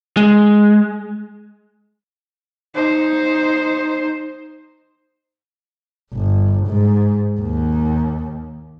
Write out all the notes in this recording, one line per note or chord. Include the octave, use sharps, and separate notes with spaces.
G#3
D#4 C5
G1
G#2
D#2